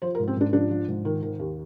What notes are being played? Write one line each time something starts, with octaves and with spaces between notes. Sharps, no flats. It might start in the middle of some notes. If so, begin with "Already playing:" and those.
F3 C5
A#4
G#2
C4
G#2 D4
F3 D4
F3
G#2
D#3
D#3
D#2